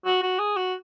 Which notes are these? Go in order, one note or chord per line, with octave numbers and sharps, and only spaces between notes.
F#4
F#4
G#4
F#4